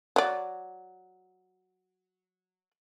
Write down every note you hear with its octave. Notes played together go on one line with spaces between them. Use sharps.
F#3 D5